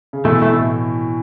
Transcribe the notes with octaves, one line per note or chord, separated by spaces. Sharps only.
C#3
B2 E3 A3
A3
A2